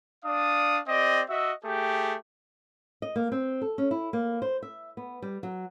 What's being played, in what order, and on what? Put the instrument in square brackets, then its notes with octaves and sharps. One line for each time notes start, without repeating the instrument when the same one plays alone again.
[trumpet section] D4 D5 F5 D#6
C4 G4 D5 D#5
F#4 D#5 E5
A3 G4 G#4 G5
[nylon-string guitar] D#5
A#3
C4
A4
C#4
E4
A#3
C5
E5
B3
G3
F#3